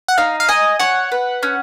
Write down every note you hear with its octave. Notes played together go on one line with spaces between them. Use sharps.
F#5
D#4 F5
F5
D#5 G#5
C#5 F#5
B4
C#4